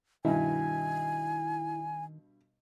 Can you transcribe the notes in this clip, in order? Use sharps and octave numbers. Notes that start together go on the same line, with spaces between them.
G2 B2 D#3 E4 G#5